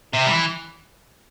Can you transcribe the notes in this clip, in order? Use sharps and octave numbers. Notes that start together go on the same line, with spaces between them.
C3
G3
E3